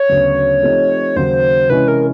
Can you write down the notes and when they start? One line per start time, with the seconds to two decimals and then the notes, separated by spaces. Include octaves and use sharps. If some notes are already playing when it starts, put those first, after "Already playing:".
Already playing: C#5
0.09 D2 C#3 F#3 B3
0.63 F3 A3 C4 D#4 G4
1.16 D#2 C#3 F#3 C5
1.69 C3 E3 G#3 C#4 E4 B4
1.88 A#4